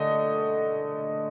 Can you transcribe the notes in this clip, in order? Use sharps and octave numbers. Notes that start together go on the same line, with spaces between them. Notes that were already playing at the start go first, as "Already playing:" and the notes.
Already playing: D3 A3 D#5